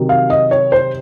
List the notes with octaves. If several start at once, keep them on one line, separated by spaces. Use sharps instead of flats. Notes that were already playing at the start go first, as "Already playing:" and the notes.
Already playing: C3 D#3 F#3
F5
D#5
C#5
C5